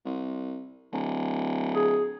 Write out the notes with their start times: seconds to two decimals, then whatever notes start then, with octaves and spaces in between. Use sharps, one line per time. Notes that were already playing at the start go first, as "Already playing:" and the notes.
0.05 C2
0.92 D1
1.74 G#4